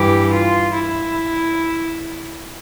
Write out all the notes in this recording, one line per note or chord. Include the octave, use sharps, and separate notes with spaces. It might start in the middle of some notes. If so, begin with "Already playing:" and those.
Already playing: G2 E3 G4
F4
E4